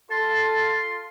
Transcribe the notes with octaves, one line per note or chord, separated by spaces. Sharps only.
F4 A4 C6 A6